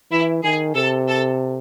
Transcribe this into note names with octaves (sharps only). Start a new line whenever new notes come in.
E3 E4
D#3 G#4
C3 A4
A4